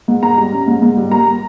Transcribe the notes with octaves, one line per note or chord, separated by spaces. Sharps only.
G#2
G#2 A#5
G3
C#4
G#2
G#2
G3
A#3 A#5